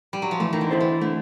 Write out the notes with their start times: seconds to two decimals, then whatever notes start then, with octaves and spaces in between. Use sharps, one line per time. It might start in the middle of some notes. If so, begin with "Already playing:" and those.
0.13 G3
0.22 F#3
0.31 F3
0.40 E3 A3
0.53 D#3
0.61 D3
0.71 C4 E4 A4 C5
0.80 E3
1.01 D3 A3